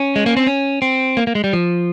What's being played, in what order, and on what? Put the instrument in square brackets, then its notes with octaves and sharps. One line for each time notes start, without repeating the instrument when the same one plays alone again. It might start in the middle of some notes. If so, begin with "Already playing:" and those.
Already playing: [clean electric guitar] C#4
G#3
A#3
C4
C#4
C4
A#3
A#3
G#3
G3
F3